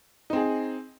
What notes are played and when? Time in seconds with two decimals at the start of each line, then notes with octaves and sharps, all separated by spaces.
0.30 D#4
0.33 C4
0.36 G#4